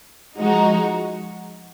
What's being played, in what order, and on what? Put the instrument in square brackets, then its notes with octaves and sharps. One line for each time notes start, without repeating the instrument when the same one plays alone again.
[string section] F3 G#3 D#4 F#4